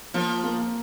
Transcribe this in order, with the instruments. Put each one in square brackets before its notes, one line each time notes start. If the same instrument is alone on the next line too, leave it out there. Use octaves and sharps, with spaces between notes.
[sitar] F3 [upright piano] A#3
[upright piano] A#3